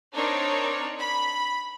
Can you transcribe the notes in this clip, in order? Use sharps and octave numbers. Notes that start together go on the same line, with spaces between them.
C4 D4 D#4 A#4 C#5
B5